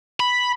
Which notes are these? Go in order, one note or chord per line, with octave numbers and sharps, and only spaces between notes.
B5